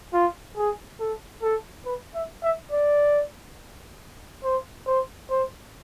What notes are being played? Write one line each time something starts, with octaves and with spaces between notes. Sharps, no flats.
F4
G#4
A4
A4
B4
E5
E5
D5
C5
C5
C5